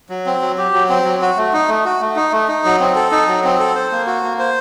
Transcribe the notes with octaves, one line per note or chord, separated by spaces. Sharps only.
F#3
C4
F#3
G4
F#3
C4
F#3
F#4
A3
D#4
A3
F#4
A3
D#4
A3
D#4
F#3
C4
A4
D#4
F#3
C4
A4
C5
A#3
F#4
A#3
C5